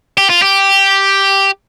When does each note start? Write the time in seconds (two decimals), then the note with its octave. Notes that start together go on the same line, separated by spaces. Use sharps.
0.18 G4
0.30 F4
0.42 G4